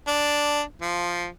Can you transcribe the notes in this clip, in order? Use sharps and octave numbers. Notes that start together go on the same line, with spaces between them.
D4
F3